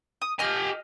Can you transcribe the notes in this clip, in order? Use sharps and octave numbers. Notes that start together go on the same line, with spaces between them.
D#6
G4 D#5 G#5 F6